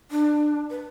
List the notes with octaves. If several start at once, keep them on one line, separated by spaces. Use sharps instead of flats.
D4
B4